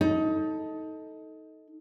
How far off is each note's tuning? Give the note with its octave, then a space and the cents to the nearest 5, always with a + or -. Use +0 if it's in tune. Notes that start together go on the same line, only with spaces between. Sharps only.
D#4 +20 A4 +0